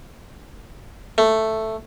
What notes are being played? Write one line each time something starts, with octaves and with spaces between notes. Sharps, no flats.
A3